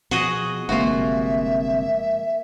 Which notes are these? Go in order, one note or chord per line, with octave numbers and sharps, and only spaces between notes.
B2 F3 F#4 G#4 D#5
G1 C3 F3 G#3 A#3 F4 F#4 E5